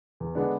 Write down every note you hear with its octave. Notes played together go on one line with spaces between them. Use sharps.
E2
D3 G#3 B3 D4